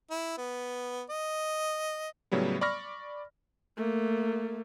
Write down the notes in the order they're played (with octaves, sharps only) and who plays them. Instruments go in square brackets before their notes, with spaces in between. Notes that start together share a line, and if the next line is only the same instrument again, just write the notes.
[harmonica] E4
B3
D#5
[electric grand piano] A2 C#3 F#3 G3 B3
D5 B5 C#6 F6 A#6
[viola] A3 A#3